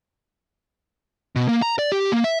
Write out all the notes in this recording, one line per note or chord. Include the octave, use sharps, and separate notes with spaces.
B2
A#3
A#5
D5
G4
A#3
E5